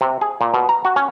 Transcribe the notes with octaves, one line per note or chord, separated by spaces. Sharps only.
C3
G#4
A#2
B2
A#5
F#4
C#4